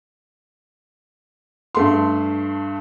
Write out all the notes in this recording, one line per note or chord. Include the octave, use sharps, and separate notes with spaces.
G2 A3 C6